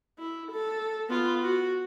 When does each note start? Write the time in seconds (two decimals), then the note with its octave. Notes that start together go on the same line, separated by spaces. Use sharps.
0.19 E4
0.52 A4
1.09 B3 F4
1.42 F#4